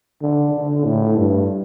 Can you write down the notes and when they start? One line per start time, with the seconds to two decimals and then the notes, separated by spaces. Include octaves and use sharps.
0.22 D3
0.54 D3
0.85 A2
1.17 G2